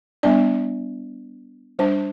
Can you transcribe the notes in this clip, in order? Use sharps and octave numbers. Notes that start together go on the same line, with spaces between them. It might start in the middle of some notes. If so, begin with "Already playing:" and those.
G3 B3 D4 D5
G3 D4 C5